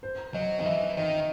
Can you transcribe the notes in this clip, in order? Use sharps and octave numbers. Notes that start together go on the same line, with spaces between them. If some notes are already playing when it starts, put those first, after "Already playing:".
C5
F#3 D#5
D#3 D#5
E3 E5
D#3 D#5